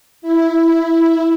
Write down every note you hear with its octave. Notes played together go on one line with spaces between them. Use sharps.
E4